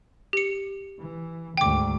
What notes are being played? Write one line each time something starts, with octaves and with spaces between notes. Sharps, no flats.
G4 C#7
E3
D2 G#2 G5 D6